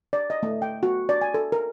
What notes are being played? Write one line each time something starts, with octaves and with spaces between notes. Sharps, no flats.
D5
D#5
A3
G5
F#4
D5
G#5
A4
A#4